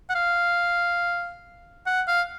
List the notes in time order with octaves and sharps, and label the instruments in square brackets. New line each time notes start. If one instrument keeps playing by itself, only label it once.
[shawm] F#5
F5
F#5
F5